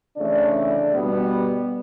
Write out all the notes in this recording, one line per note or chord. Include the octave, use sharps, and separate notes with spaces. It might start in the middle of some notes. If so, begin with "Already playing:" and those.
C#3 E3 A3 D4 D5
B2 G3 B3